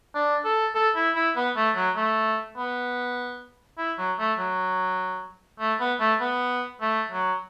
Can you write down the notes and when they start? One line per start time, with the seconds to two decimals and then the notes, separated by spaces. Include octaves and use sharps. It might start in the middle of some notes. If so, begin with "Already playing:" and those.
0.15 D4
0.45 A4
0.75 A4
0.96 E4
1.16 E4
1.36 B3
1.56 A3
1.76 F#3
1.96 A3
2.57 B3
3.78 E4
3.98 F#3
4.19 A3
4.39 F#3
5.60 A3
5.80 B3
6.00 A3
6.21 B3
6.81 A3
7.12 F#3